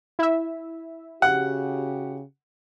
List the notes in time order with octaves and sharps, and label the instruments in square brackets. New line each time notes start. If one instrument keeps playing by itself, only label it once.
[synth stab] E4 E5
[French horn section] C#3 F#4 G4 [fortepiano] F#5